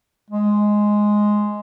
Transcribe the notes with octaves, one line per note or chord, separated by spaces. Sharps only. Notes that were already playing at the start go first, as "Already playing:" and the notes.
G#3